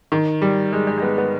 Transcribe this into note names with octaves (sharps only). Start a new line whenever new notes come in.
D#3
G3
G#3
G#3
G#3
B3
B3